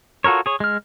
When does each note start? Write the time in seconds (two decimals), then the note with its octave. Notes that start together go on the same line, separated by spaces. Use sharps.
0.24 F4 F#4 A4 A#4 C#5
0.46 G#4 C#5
0.60 G#3 F6